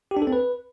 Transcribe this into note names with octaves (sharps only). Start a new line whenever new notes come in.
G4
D4
A4
C4
B4